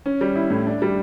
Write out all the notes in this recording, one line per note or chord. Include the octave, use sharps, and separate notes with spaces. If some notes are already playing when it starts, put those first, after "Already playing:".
C#4
G3
E4
A2
D4
G3